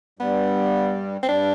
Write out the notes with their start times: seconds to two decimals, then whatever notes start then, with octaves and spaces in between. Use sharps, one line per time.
0.19 G2 G3 B3
1.23 C4
1.28 G2 G3 D4